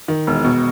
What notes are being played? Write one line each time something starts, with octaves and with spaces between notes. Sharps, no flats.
D#3
E1
B2